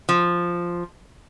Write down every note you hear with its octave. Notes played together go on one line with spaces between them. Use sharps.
F3